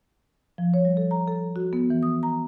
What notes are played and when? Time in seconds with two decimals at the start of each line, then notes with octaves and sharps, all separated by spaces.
0.58 F3
0.74 C#5
0.85 G3
0.97 A4
1.11 A#5
1.28 A4
1.56 F#4
1.73 B3
1.90 E3
2.03 D#6
2.23 A#5